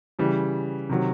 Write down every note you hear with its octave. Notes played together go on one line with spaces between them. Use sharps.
C#3 E3 G3
C3 D#3 F#3